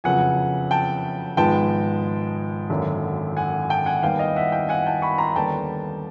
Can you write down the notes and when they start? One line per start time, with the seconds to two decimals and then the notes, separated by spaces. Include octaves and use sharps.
0.04 F#1 F2 C#3 F#3 B3 F#5 G#5
0.71 G5 A5
1.37 G#1 G#2 F3 G#3 B3 G5 A5
2.70 G#1 F#2 D3 F#3 A#3
3.37 F#5 G#5
3.69 G5 A5
3.86 F#5 G#5
4.03 D#2 D#3 G3 B3 F5 G5
4.19 D#5 F5
4.36 E5 F#5
4.52 F5 G5
4.69 F#5 G#5
4.86 G5 A5
5.02 B5 C#6
5.18 A#5 C6
5.35 D#2 D3 G3 B3 G5 A5